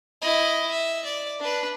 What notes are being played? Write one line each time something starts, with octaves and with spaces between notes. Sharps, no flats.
E4 D#5
E5
D5
D4 B4